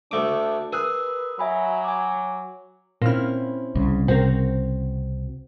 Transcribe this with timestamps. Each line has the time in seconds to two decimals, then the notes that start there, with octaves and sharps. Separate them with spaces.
0.11 D2 A3 D4 D6
0.73 G#4 A#4 B4 E6 F#6
1.39 F#3 E5 G#5 B5
1.84 G#5 D6
3.02 A#2 C4 C#4 E4 F6
3.75 C2 C#3
4.08 C3 C4 F#4 A#4